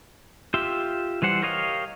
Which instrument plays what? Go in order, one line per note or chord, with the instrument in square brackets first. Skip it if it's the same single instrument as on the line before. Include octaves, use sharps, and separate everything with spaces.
[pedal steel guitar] F4 G4 E5 C6
E3 G3 C5 F#5
G4 A#4 C#5 D#5 F5